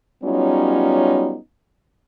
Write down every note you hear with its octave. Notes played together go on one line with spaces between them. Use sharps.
F#3 G3 B3 C#4 D#4 F4